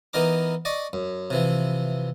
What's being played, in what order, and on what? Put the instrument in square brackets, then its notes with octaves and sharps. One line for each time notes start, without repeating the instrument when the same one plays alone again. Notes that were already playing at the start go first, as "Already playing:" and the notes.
[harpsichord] E3 B3 D#4 A#4 D6
D5 D#5 C#6 D6
F#2
C3 E3 F3